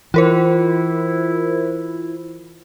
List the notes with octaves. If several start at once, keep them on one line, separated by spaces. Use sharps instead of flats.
E3 E4 F4 A#4 C5